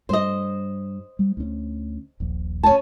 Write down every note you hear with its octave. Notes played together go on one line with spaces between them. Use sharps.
G2 C5 D#5
G3
D2 C#4
D#1 A#1
C#4 A5